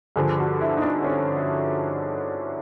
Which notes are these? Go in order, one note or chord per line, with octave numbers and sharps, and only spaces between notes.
G2 D3 F3 G#4
F#4
E4
D#4
D4
C#4